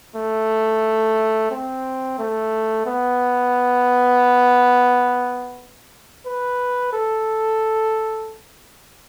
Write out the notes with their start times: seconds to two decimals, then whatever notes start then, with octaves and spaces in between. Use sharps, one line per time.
0.16 A3
1.51 C4
2.18 A3
2.86 B3
6.26 B4
6.93 A4